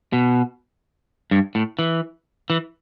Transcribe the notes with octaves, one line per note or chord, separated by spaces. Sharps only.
B2
G2
A2
E3
E3